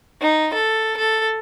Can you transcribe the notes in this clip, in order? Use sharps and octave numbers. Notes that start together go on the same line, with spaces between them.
D#4
A4
A4